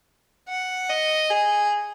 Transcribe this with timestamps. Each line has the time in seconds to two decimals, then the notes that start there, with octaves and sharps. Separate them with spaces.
0.49 F#5
0.89 D#5
1.30 G#4